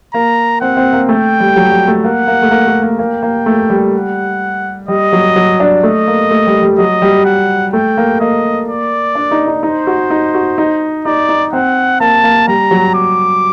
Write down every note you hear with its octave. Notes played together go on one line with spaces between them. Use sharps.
A#3 A#5
C4 F#5
C4
A#3
A3 G5
G3
F#3
G3
A3
A#3 F#5
A#3
A3
A#3
A3
A#3
A#3 G5
A#3
A3
G3
F#5
G3 D#5
F#3
F#3
D4
A3 D#5
A#3
A3
G3
G3
F#3 D#5
G3
F#5
A3 G5
A#3
A#3 D#5
D5
D4
D#4
D#4
D#4 C5
F#4
D#4
F#4
D#4
D#4 D5
D#4
C4 F#5
A#3 A5
A#3
G3 A#5
F#3
D6